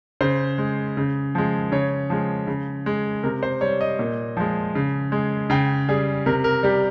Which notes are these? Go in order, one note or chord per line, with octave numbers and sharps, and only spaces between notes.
C#3 C5
G#3
C#3
F3 G#3
C#3 C#5
F3 G#3
C#3
G#3
C3 A#4
C5
G3 C#5
D#5
A#2
F3 G#3
C#3
G#3
C#3 G5
G3 G#4
C3 A#4
A#4
G3 G4